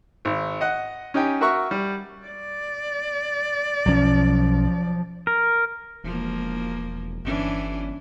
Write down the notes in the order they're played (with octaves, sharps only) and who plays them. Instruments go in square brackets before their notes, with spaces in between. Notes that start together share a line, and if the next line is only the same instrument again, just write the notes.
[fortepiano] G#1
D#5 F#5
C#4 D#4 G4 G5 G#5
F#4 A#4 E5 F#5 C#6
G3
[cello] D5
[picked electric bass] B1 C#4 [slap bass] F3 F#3
[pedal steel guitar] A#4
[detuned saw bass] E1 [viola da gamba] F3 A#3
[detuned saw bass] G1 [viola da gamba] E3 C#4 D4